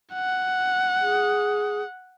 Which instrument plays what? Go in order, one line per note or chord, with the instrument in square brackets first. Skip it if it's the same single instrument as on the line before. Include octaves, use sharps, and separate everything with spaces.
[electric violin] F#5
[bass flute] G#4